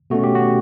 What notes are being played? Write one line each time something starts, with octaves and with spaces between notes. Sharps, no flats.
B2 A3 C#4 F#4
G4
F#4